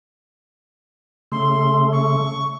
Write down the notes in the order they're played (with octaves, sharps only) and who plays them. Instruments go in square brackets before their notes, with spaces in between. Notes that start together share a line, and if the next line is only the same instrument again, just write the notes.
[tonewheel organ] C#3 A3 [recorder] C6
[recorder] C#6